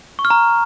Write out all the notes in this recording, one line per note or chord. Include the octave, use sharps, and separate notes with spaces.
C#6
F6
A#5